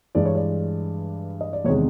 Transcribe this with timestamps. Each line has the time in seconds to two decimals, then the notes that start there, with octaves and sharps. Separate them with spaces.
0.15 G2 E3 G#3 D5
0.25 C#5
0.35 D5
1.41 D#5
1.53 D5
1.64 E2 C3 D#3 G#3 C#5